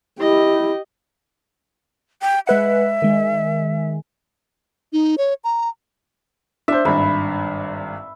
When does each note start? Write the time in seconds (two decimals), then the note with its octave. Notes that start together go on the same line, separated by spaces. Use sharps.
0.20 E4 G4 D#5
2.22 G5
2.47 G#3 B4 E5 F#5
3.02 D#3 G#3
4.93 D#4
5.18 C#5
5.44 A#5
6.68 D4 C5 E5
6.85 G#1 G2 B5